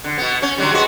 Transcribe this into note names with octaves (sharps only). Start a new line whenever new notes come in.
D3
B2 B3
C#4
D3 F#3 G3
G#3 F#4 B4